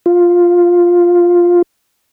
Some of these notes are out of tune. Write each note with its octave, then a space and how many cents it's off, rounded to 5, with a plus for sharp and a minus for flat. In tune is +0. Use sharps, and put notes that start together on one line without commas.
F4 +5